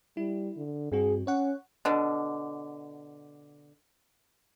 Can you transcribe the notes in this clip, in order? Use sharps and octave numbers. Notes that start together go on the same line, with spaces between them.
G3 E4
D3
G2 C4 F#4 G#4
C#4 C#5 F#5
B2 D3